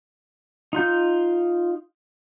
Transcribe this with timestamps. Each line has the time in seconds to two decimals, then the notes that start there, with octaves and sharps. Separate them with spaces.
0.73 D#4 F4 G6